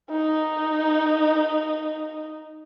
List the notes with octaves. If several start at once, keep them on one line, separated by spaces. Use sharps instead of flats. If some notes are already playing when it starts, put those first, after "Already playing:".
D#4